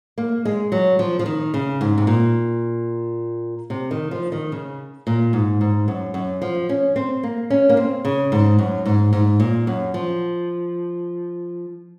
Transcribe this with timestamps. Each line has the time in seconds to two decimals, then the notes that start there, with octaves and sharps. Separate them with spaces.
0.18 A#3
0.45 G#3
0.72 F#3
0.99 F3
1.19 F3
1.26 D#3
1.54 C#3
1.81 G#2
1.98 C3
2.07 A#2
3.70 C3
3.91 D#3
4.11 F3
4.32 D#3
4.52 C#3
5.07 A#2
5.33 G#2
5.61 G#2
5.88 F#2
6.14 F#2
6.42 F3
6.69 C#4
6.96 C4
7.23 A#3
7.50 C#4
7.69 A#3
7.77 C4
8.05 C#3
8.32 G#2
8.59 F#2
8.86 G#2
9.13 G#2
9.40 A#2
9.67 F#2
9.94 F3